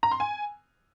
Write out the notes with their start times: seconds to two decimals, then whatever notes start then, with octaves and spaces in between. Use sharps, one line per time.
0.03 A#5
0.11 C6
0.20 G#5